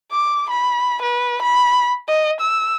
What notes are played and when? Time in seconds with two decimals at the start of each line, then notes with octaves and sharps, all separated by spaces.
0.12 D6
0.50 B5
1.02 B4
1.42 B5
2.08 D#5
2.41 E6